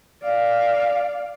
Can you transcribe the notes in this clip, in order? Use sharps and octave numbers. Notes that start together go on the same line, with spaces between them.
D5 F5